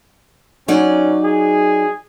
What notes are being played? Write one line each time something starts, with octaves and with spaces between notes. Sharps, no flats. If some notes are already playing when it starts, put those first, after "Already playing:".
F#3 C#4 D#4 D5
G#4